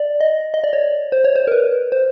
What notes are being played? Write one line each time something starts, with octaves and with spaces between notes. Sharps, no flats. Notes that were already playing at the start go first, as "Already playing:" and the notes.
Already playing: D5
D#5
D#5
D5
C#5
C5
C#5
C5
A#4
B4
C5